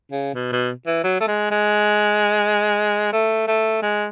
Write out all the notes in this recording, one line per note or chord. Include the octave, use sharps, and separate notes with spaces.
C#3
B2
B2
E3
F#3
A3
G#3
G#3
A3
A3
G#3